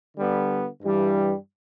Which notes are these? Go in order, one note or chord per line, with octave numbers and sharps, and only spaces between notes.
D3 G3 B3
G2 E3 G3